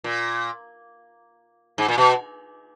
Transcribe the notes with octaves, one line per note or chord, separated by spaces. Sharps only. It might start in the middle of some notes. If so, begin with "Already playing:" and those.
A#2
G#2
A#2
B2